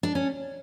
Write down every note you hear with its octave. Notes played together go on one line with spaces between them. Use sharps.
D4
C#4